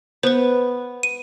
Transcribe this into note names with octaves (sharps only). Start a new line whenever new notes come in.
B3 B4 C5
D#7